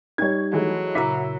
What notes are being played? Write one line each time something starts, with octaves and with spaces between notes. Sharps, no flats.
G3 D#4 C#5 G5 G#6
E3 F#3 G#3 A3
A#2 C#3 E4 A#5 B6